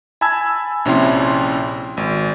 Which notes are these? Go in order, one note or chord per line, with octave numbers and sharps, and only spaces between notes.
G#5 A5 B5 E6 G#6
A#1 C3 C#4 E4 G5 C6
G#1